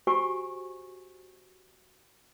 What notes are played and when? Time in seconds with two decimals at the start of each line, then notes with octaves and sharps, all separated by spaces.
0.07 F#4 G4 C5 G#5 C#6